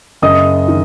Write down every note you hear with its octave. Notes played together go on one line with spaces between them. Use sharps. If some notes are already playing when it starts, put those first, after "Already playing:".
F#1 D#5 D#6
D#3